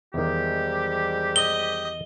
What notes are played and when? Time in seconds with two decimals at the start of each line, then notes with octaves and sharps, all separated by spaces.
0.14 E2 G#2 D#3 G3 G4
1.36 D#5 G7